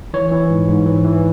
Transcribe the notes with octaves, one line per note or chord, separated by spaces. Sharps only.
E3 C#5
E3
G#2
G#2
E3
E3